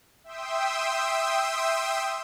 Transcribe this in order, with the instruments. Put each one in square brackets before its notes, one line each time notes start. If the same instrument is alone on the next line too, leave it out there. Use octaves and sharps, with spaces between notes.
[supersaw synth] E5 G5 C6 D#6 E6